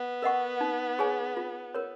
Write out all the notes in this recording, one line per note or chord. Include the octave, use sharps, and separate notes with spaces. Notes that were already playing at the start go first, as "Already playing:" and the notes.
Already playing: B3
A#4 D#5 F#5 C#6
D#4
G#4 C#5 G#5
F4
A#4 C#5